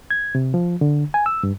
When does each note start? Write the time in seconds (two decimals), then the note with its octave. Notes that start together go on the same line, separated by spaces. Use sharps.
0.10 G#6
0.35 C3
0.54 F3
0.81 D3
1.14 G#5
1.26 E6
1.43 G2